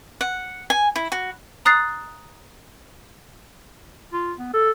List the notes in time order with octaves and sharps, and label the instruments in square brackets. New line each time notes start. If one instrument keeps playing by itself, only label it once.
[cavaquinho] F#5
G#5
E4
F#4
[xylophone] A#5 D#6 F#6 A6 C7
[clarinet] F4
B3
A4